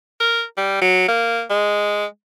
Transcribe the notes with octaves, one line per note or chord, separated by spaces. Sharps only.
A#4
G3
F#3
A#3
G#3